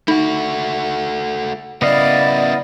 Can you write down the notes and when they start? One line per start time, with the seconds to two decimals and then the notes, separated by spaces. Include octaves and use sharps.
0.08 A3 D#4 F#4
1.82 C#3 B3 E4 D5 D#5 F5